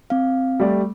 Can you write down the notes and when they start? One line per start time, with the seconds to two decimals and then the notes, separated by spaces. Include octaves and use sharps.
0.10 C4 F5
0.60 G3 A3 D5